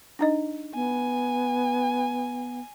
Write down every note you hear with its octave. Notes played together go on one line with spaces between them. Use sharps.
D4 D#4 D#5
B3 G#5